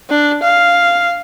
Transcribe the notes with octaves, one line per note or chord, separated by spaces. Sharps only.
D4
F5